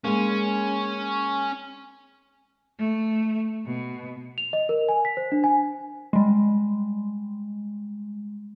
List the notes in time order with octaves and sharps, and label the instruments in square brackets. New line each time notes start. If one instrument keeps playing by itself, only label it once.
[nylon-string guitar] G#3 A#3 [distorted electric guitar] C#4
[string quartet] A3
B2
[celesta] F7
D#5
A#4
G#5
B6
C5
D4
G#5
[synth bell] G3 G#3